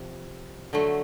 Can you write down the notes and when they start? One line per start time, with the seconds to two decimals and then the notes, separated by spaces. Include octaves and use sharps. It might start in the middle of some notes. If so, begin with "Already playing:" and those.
Already playing: C3 F3
0.73 D3 F#3 A3